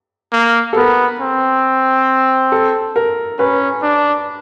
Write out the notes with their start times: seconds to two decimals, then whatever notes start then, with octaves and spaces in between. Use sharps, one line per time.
0.32 A#3
0.73 A4
0.76 B3 A#4
1.20 C4
2.52 A4
2.96 A#4
3.39 C#4 B4
3.82 D4